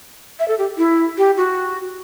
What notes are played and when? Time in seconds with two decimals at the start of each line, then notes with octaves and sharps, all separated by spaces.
0.39 E5
0.48 A4
0.59 G4
0.78 E4
1.17 G4
1.37 F#4